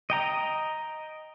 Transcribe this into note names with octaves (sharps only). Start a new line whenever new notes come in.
D#5 G5 A#5